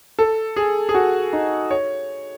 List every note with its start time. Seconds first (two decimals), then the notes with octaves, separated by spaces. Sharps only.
0.19 A4
0.56 G#4
0.89 G#4
0.94 F#4
1.33 D#4
1.71 C#5